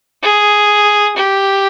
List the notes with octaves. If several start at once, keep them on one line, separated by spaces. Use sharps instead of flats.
G#4
G4